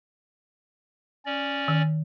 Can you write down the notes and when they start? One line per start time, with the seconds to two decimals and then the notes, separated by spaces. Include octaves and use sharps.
1.26 C#4 D5
1.68 D#3